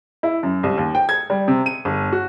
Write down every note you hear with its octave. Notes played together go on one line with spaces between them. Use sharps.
E4
F#2
C2
D#2
G5
G#6
G3
C3
D#7
G1
F#4